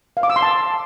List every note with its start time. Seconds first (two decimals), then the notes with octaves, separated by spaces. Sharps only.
0.17 F5
0.23 D6
0.30 E6
0.36 C6
0.42 A5